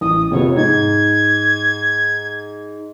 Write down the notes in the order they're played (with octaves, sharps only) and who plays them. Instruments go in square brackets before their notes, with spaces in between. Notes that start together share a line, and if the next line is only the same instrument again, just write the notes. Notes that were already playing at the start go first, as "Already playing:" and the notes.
[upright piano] A1 [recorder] D#6
[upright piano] F2 C3 B3 [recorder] C#5
[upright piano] G#2 [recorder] G#6